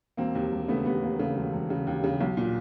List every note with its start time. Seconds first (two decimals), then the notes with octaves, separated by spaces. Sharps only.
0.17 E1 A#3 C4
0.35 D#2
0.52 E1
0.68 C#3 A3 B3
0.85 D#2 A3 B3
1.02 D#2 A#3
1.19 C#3 A3
1.36 E1
1.52 E1
1.70 C#3
1.87 D#2
2.04 C#3
2.20 B1
2.37 A#2